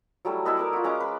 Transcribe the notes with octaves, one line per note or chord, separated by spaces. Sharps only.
F#3 G3 A3 E4
E4 A4 B4 D#5
A#4 B4 D5
F4 F#4
G#3 C#4 A#5 D6
B4